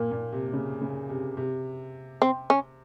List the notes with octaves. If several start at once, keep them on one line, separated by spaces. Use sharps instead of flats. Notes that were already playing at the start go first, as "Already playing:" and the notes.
Already playing: A#2 A#3
A#2
C3
C#3
C#3
C3
C3
C4
C#4